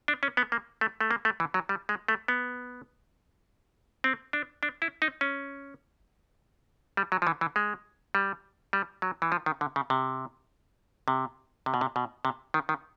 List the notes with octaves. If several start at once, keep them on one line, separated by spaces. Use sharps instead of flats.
D4
C#4
B3
A#3
A3
A3
A#3
A3
E3
F#3
G3
G#3
A3
B3
C4
D4
D4
E4
D#4
C#4
G3
F#3
F3
E3
E3
G#3
G3
G3
F#3
E3
F3
D#3
D3
C#3
C3
C3
C3
B2
C3
B2
C3
D#3
D#3